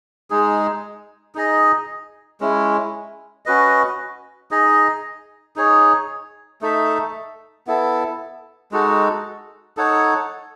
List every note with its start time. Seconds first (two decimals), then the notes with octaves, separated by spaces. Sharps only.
0.30 G#3 D#4 G#4
1.35 D#4 G#4 D#5
2.41 G#3 C#4 E4
3.46 C#4 F#4 B4 D#5
4.51 D#4 G#4 D#5
5.56 D#4 G#4 C#5
6.61 A3 D#4 A4 E5
7.67 B3 E4 A4
8.72 G#3 D#4 F#4 A4
9.77 D#4 A4 C#5 F#5